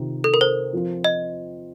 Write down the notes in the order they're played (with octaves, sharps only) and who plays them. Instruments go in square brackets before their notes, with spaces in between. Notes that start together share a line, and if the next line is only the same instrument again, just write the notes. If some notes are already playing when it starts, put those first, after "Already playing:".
Already playing: [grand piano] C3 D#3 F4
[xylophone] A4
A#4
C5
[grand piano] F3 C4 F4
[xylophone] D#5